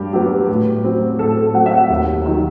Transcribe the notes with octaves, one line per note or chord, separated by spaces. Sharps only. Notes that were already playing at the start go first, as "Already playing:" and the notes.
Already playing: G2 G4
F#3 B3 G4
A2
F#3 C4
A2 A4
A4
F#3 C4 F#5
E5
F#5
D#2
D#3 F#3